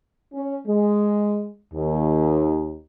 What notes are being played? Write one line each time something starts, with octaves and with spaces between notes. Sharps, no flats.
C#4
G#3
D#2